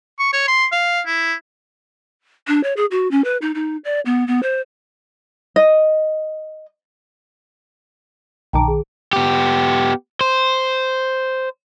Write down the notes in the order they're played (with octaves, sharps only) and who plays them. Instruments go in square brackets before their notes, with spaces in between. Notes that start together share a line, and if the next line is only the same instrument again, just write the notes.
[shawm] C#6
C#5
C6
F5
E4
[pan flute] D4
C#5
G#4
F#4
C#4
B4
D#4
D#4
D5
B3
B3
C5
[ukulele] D#5
[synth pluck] B1 D#3 D6 [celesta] G5 A5 A#5
[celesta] G#4
[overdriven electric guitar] B3 G4
C5